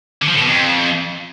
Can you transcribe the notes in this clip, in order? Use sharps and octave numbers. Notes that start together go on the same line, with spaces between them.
D3
F3
A2
B2
F2